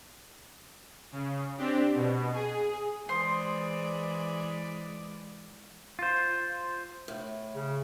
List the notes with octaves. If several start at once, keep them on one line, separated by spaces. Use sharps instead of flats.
C#3
C4 D4 G4
B2
G#4
E3 G#3 C5 D5 C6 D#6
F4 C5
A2
C#3 G#4